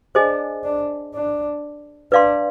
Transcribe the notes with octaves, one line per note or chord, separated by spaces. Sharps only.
D4 G#4 C5 D#5 G#5
D4
D4
D4 B4 D5 F5 C6